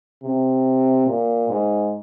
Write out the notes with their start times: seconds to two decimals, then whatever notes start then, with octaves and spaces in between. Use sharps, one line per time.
0.23 C3
1.07 A#2
1.49 G#2